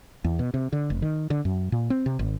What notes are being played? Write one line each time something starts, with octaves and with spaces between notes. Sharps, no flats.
E2
B2
C3
D3
F1
D#3
D3
F#2
A#2
C4
C3
G#1